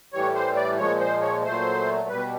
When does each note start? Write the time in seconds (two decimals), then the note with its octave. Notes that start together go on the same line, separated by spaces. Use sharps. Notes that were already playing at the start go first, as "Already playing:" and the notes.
0.13 A2 E3 G3 C#5
0.35 C5
0.56 D5
0.78 A#2 F3 G#3 C#5
1.01 C5
1.22 C#5
1.43 A#2 F#3 A3 C5
2.09 B2 G3 B4